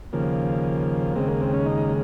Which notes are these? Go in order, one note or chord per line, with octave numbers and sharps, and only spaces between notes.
D#2 C#3 F3 A#3
D#2 C#3 G#3 C4
A#3
C4
C#4
D#4